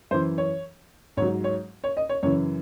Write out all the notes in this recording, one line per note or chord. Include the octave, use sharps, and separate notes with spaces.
F#2 E3 C5
C#5
G#2 F#3 C#5
C#5
C#5
D#5
C#5
F#2 C#3 E3 C#5